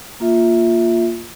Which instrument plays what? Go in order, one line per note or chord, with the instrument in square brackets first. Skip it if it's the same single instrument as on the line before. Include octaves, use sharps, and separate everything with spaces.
[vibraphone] A#3 F4 E5